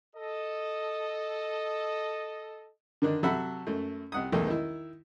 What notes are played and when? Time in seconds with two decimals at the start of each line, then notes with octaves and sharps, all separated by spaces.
0.15 A4 D#5
3.02 D3 D#3 D4
3.23 C3 F#3 A4 E5 F#5 B5
3.67 F#2 A3
4.12 C2 F#5 D#6
4.32 B1 E2 B2 D#3 A3
4.47 D#3 E4